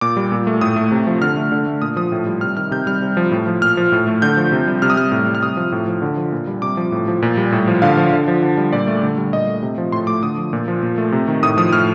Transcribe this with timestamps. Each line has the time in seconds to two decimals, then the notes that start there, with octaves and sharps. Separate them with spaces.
0.01 A#2 D6
0.17 G3
0.32 A#2
0.47 A3
0.61 A2 D#6
0.76 A3
0.92 C3
1.07 F3
1.21 D3 F6
1.37 A3
1.52 D3
1.66 A3
1.82 A#2 D#6
1.97 F3 D#6
2.12 A2
2.27 G3
2.41 C3 F6
2.57 D#3 F6
2.71 C3 G6
2.87 G3 F6
3.02 C3
3.17 F3
3.31 A2
3.47 F3
3.62 A#2 F6
3.77 F3
3.92 A2
4.07 A3
4.22 D3 G6
4.37 F3
4.52 C3
4.67 G3
4.82 C3 F6
4.90 D#6
4.97 G3 F6
5.12 A2
5.27 G3
5.35 F6
5.43 C3 D#6
5.57 F3
5.72 A2
5.87 F3
6.02 D3
6.17 F3
6.32 A#2
6.47 G3
6.62 C3 D6
6.77 F3
6.92 A2
7.08 F3
7.22 A#2
7.37 G3
7.52 A2
7.68 F3
7.82 D3 F5
7.97 F3
8.13 D3
8.28 F3
8.43 D3
8.57 G3
8.73 A#2 D5
8.87 A3
9.03 D3
9.18 G3
9.33 A#2 D#5
9.47 A3
9.63 C3
9.78 F3
9.92 A2 C6
10.07 A3 D6
10.23 D3 D#6
10.38 F3
10.53 A#2
10.68 F3
10.83 A#2
10.98 A3
11.12 C3
11.28 D#3
11.43 A2 D#6
11.57 F3 D#6
11.73 A2 F6